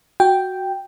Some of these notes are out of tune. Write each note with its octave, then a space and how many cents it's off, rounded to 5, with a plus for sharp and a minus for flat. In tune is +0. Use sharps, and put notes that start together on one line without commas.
F#4 +0 G5 +0